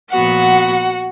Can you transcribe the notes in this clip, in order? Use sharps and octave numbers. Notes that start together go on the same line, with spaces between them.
A#2 F3 B3 F#4 F#5